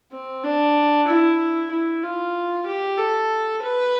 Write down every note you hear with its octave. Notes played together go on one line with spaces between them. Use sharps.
C4
D4
E4
E4
F4
G4
A4
B4